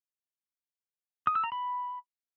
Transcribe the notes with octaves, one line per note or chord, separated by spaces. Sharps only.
D#6
E6
A#5
B5